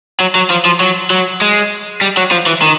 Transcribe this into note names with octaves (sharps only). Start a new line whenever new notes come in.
F#3
F#3
F3
F3
F#3
F#3
G#3
G3
F#3
F3
E3
D#3